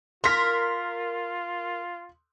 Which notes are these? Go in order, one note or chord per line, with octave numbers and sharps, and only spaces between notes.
F4 A#4 C6 B6